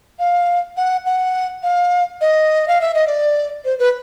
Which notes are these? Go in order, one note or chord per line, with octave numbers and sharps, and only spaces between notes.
F5
F#5
F#5
F5
D#5
F5
E5
D#5
D5
C5
B4